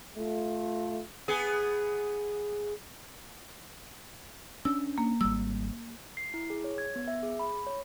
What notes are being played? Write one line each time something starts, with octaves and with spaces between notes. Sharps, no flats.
A3 F4
B3 G#4
C#4 D4 E6
A#3
G#1 G3 E6
C7
E4
G#4
C#5
G#6
B3
E5
G#4
B5
C#5